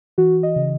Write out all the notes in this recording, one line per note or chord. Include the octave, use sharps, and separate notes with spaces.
E3 F#4
D#5
C#3